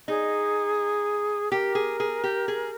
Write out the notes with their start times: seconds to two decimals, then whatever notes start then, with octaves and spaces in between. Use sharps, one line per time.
0.08 D#4 G#4
1.51 G4 A#4
1.75 G#4
2.00 G#4
2.24 G4
2.48 G#4